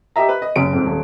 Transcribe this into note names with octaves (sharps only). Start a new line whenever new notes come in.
G4 D#5 E5 A#5
B4
D#5
F#1 C#3 D7
F2 G#2
D#1